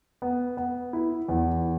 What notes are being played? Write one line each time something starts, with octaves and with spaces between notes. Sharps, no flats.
B3
B3
E4
E2